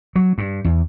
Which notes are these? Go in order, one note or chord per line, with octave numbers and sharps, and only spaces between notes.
F#3
G2
E2